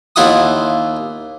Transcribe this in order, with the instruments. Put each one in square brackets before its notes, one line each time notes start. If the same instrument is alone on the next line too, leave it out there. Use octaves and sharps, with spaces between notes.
[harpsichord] D#2 E4 F4 F#5 D#6